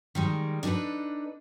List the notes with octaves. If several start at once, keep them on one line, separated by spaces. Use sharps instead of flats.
D#3 G3 G#3
D4 D#4 G#4 A4 B4